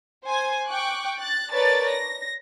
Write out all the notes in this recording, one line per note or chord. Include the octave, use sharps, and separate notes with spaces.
C5 G#5
G5 C#6 D6 F#6
F#6 A6
A#4 B4 C#5 D5 A5 A6
A#6